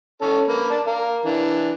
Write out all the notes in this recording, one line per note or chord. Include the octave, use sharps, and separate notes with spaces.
C#4 A4 C#5
A#3 B4
D5 A5
A#4 F5
E3 D4